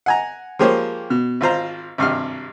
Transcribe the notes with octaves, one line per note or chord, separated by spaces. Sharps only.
F#5 G#5 A#5
F3 G#3 A#3 G4 C5 C#5
B2
G#1 F4 C5 A#5
G#1 G2 C3 F6